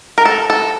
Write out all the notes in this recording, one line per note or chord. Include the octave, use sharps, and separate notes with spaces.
A#4
A4
A4